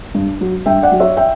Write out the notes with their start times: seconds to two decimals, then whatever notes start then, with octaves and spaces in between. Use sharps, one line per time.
0.15 G2
0.41 F#3
0.66 G2 E5 G5
0.83 D5 F#5
0.91 F#3
1.00 C#5 E5
1.17 E5 G5